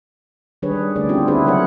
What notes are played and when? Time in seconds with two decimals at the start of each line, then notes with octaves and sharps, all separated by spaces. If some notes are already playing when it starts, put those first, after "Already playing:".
0.62 D#3 G3 D4 G#4 B4 C#5
0.96 D3 A3 C#4 G#4 D5
1.09 B3 C4 D4 E4 F4 G4
1.28 D4 E4 G4 G#4 B4 C5
1.45 C#3 F#3 E4 A#4 C#5 F#5